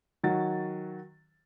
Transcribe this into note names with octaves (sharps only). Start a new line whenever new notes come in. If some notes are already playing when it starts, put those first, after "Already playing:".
D#3 F#3 F#4 A6